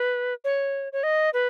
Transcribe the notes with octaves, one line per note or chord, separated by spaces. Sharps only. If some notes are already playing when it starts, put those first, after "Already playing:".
Already playing: B4
C#5
C#5
D#5
B4